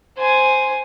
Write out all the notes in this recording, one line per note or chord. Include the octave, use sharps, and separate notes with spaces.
C5 G#5